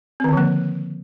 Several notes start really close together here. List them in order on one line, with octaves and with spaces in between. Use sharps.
C4 D#3 D3 F3 A#3